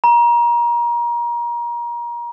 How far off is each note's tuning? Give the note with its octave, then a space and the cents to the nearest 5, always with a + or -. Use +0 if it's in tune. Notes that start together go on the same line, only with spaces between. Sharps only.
A#5 +30